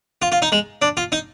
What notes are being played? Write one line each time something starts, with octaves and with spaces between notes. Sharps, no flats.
F4
F4
D#4
G#3
D4
F4
D#4